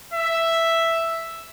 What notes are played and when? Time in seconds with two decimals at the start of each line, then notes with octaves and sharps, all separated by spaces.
0.13 E5